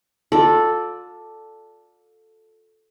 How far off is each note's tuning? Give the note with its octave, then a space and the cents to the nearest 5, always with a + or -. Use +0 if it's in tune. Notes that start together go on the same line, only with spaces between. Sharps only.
F4 +40 A4 +0 D5 +0